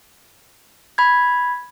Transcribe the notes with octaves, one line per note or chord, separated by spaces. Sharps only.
B5 G#6